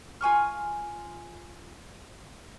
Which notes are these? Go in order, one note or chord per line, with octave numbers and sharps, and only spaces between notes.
F4 G#5 C#6 F6